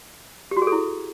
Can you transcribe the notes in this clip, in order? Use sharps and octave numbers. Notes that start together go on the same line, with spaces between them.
G4
F#4
G#4
A4
E4